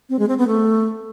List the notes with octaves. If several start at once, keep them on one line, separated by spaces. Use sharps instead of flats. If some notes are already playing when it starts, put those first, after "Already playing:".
C4
G#3
C4
B3
A3